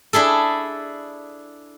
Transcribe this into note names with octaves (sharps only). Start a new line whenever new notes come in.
D4 E4 G#4 A4